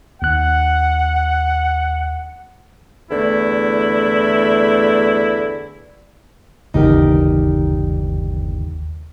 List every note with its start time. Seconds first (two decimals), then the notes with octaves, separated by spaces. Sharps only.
0.22 D#2 F#5 F#6
3.10 E2 D3 A3 E4
6.74 G1 D#2 C#3 E3 D#4 G4 A#4